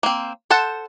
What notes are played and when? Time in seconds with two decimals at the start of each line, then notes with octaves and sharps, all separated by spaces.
0.03 A#3 C4
0.50 A4 C5 F#5 A5